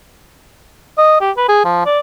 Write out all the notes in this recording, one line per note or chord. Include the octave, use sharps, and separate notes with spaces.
D#5
G4
B4
G#4
F3
D5